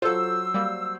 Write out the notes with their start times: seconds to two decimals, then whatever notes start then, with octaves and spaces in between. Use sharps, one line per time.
0.02 F#3 F4 A4 C5 E6
0.54 G3 A#3